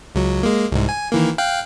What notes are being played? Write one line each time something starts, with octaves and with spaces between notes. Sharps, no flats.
C#2 F#3
G#3 A#3
C2 G#2
G#5
D#3 E3 A#3
F5 G5 F#6